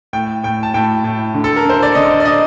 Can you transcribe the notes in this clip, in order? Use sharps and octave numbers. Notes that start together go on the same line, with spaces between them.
A2 G5
A2 G5
A5
A2 G5
A2
D3
A4
A#4
D3 C5
D5
D3 D#5
D5
D#5